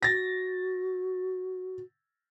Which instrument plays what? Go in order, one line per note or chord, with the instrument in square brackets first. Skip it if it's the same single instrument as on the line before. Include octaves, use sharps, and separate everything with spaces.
[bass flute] F#4 [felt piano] A6 A#6